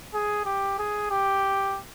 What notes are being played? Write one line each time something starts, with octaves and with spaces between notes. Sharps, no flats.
G#4
G4
G#4
G4